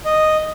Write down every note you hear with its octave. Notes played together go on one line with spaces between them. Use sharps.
D#5